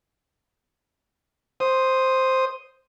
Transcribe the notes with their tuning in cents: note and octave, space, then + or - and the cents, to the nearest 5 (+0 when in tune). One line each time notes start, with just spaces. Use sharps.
C5 +0 D#6 +0